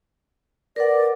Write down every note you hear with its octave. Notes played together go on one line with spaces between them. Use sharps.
A#4 B4 D5 F#5